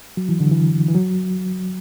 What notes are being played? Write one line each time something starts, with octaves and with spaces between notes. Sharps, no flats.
F#3
E3
D3
E3
E3
F#3